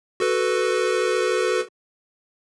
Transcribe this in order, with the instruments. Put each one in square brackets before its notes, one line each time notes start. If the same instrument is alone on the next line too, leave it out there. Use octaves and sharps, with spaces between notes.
[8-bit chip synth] F#4 A4 B4